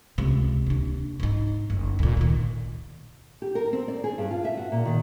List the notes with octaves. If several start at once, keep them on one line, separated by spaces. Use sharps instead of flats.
C#2 C3
D#2 D4
G#2 D#4
F#1
D2 A#2
A#2 D#3
G4
A#4
C4
D5
G#4
G2
F4
E5
F#4
A#2
D#3